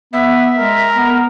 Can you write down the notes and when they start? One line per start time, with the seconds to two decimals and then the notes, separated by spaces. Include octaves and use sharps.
0.13 B3 E5
0.59 G#3 A#4
0.95 B3